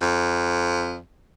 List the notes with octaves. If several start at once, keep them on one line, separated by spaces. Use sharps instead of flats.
F2